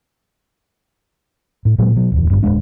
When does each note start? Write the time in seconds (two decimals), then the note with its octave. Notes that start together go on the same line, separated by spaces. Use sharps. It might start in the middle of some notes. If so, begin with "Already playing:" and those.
1.65 A2
1.79 A#2 F#3 G#3
1.95 B2 F#3
2.12 D1 E2
2.30 G#1 G2
2.43 D1 D2 G#3 D4